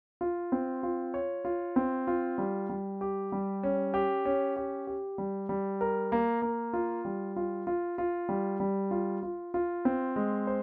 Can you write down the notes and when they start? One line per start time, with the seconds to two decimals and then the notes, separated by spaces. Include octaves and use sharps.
0.21 F4
0.52 C4
0.83 F4
1.14 C#5
1.45 F4
1.76 C4
2.07 F4
2.38 G3
2.69 G3
3.01 G4
3.32 G3
3.63 C#4
3.94 G4
4.25 C#4
4.56 G4
4.87 G4
5.18 G3
5.49 G3
5.81 A#4
6.12 A#3
6.42 A#3
6.73 F4
7.05 G3
7.36 F4
7.67 F4
7.98 F4
8.29 G3
8.60 G3
8.91 F4
9.23 F4
9.54 F4
9.85 C4
10.16 G#3
10.47 C5